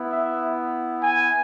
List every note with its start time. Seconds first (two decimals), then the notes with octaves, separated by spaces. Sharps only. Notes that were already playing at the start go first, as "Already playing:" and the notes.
Already playing: B3 E4
0.12 E5
1.03 G#5